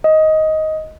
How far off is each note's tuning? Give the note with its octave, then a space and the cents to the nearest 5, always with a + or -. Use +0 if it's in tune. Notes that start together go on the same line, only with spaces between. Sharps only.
D#5 +10